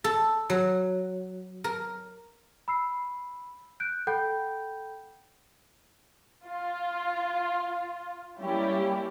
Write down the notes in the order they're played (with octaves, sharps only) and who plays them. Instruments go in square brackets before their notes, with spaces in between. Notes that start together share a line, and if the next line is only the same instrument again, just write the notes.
[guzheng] A4
F#3
A#4
[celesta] B5 E6 C7
F#6 G6 D7
A4 F#5 G5 B5 G6
[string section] F4
G3 A#3 C#4 E4 G4